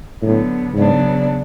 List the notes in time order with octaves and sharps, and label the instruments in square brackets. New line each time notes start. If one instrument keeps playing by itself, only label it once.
[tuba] A2 [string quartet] D3 F#3 B3
[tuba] G#2 [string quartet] C#3 F#3 B3 D4